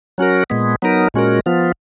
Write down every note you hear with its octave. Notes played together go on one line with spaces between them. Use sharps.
F#3 C#4 F#4 A#4
A#2 G#3 B3
F#3 B3 D#4 A#4
A#2 G#3 C#4 F#4 A#4
F3 B3 F4